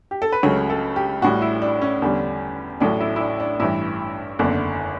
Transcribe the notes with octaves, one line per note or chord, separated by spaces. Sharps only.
G4
A4
B4
C#2 C#3 F#3 A3 C#5
A4
G4
A1 A2 G3 F#4
E4
D4
C#4
E2 D3 G3
A1 A2 F#3 A3 D4
E4
E4
D4
D4
A1 G2 E3 E4
F#1 E2 D3